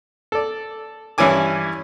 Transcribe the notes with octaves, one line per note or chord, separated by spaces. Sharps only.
A4 D5
G2 E3 C#4 E4 G#5 D6